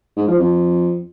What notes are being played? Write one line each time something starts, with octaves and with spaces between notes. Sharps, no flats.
G#2
F3
F2